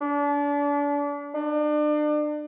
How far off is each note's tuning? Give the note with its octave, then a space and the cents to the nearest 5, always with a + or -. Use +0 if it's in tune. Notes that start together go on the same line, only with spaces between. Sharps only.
D4 -35
D4 +35